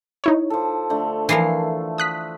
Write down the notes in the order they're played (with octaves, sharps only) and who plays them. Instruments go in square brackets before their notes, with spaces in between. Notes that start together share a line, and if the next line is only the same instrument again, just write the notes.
[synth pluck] D#4 E4 C#5
[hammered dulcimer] F3 A4
D3 A3
[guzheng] E3 F3 A#4 [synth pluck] C7
[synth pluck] D#6 F#6 B6